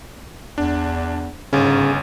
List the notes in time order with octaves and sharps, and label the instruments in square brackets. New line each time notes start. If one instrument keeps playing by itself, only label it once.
[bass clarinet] E2 [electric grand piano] D4
[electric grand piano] G1 C#4 [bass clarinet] G#2 [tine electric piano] C#3